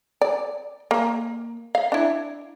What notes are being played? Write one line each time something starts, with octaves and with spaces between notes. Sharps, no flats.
D5
A#3
F5
D4 E4